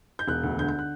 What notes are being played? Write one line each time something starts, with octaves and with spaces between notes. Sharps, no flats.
G6
E1 F#6
D2
D3 G6
G6
F#6